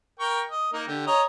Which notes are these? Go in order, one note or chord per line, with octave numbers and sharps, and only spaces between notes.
A#4 G5 C#6
D#5
A#3 D#4 A#4
D3 G4
C#5 D#5 A#5